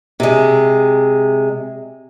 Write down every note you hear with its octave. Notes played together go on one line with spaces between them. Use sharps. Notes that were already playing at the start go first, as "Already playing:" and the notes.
C3 G#3